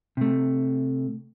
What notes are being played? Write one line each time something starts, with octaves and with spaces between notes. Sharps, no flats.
C3 A3